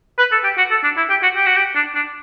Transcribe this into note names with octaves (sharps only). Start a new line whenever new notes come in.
B4
A4
G4
F#4
A4
D4
E4
G4
F#4
G4
F#4
G4
D4
D4